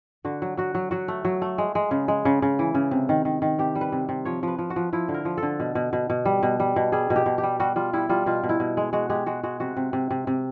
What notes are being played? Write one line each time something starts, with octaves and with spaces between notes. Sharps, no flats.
D3 F#4
F#3
F#3 F#4
F#3
F#3 F#4
A3
F#3
A3
G#3
G#3
C#3
G#3
C#3
C#3
E3
C#3
C3
D#3
D#3
D#3
C3 G4
G3
B4
C3
C3
F3 C#5
F3 B4
F3
F#4
F3
F3 E4
D3
A#4
F3
A4
D3
B2
B2
B2
B2
G3
B2
G3
B2
G3 G#4
B2
G4
B2
G4
G3
G3 F#4
G3 F4
G3 E4
G3 F4
B2 F4
B2
E4
B2
G#3
G#3 F#4
G#3 G4
G#3 F#4
G#3 F#4
C3 F#4
C3
C3
C3
C3